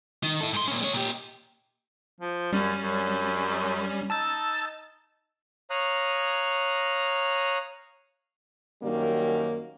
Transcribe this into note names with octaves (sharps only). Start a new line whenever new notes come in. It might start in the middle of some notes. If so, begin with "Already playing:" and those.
D#3
E4 A4
G#2 C6
A#2 C#4
G#3 C#5
A#2 G4
F3
F#2 G3 C#4
F#2
D#4 A5 E6 A6
C#5 F5 A#5 D#6 F#6
F#2 D#3 G3 A#3 C#4 F#4